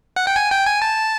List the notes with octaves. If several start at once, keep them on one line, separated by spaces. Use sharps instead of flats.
F#5
G5
G#5
G5
G#5
A5